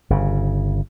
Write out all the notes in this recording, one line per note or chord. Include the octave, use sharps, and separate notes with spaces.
G1 C#3